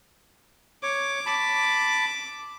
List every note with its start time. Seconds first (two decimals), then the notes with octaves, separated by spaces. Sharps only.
0.83 C#5 D6
1.26 A5 B5